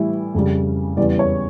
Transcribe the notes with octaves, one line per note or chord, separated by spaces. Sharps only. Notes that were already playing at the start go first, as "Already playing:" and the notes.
Already playing: A2 E3 G3 E4
F2 C#3 G3
E2 C#3 E3 G3 D5
C#5